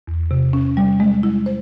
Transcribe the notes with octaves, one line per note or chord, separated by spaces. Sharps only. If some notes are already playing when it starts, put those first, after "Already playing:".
E2
C3
C#4
G3
G#3
E4
C5